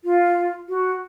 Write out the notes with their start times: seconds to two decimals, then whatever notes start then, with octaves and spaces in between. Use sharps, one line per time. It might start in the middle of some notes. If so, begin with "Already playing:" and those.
0.04 F4
0.69 F#4